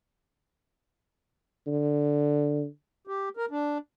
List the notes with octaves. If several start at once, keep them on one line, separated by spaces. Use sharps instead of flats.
D3
G4
A#4
D4